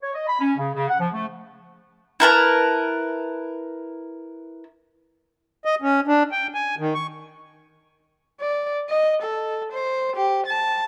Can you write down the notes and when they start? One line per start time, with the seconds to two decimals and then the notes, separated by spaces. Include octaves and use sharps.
0.01 C#5
0.14 D#5
0.27 B5
0.40 C#4
0.57 C#3
0.74 C#3
0.88 F#5
1.00 F3
1.13 A3
2.20 E4 A#4 B4 A5
5.65 D#5
5.82 C#4
6.07 D4
6.32 G5
6.54 G#5
6.79 D#3
6.95 C#6
8.40 D5
8.89 D#5
9.22 A4
9.72 C5
10.16 G4
10.47 A5